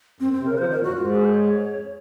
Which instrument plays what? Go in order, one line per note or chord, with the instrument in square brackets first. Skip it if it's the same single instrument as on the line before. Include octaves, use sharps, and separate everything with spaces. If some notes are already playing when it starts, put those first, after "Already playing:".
[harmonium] F#2 [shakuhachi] C4
[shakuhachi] C4
[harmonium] C3
[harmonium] C#3 [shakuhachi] A#4
[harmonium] F3 [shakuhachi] C5
[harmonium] D#3
[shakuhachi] A#4
[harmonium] A#2
[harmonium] F#2 [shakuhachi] F#4
[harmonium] G#2 [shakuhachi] F4
[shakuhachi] F#4
G#4
C5
C#5
[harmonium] F2